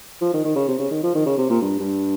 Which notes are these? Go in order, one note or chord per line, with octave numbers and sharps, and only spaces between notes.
F3
D#3
D#3
C#3
C3
C#3
D#3
F3
D#3
C#3
C3
A#2
G2
G2